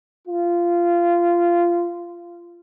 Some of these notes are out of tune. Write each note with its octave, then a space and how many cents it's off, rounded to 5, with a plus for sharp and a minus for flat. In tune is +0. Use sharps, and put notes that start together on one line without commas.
F4 -15